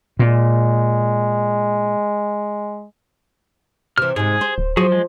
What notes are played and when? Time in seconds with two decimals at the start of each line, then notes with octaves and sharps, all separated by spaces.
0.19 A#2 G#3
3.98 C3 E3 F6
4.16 G#2 C3 G#4
4.41 C5
4.58 D1
4.77 F3 F#3 F#4 G#4
4.92 G#3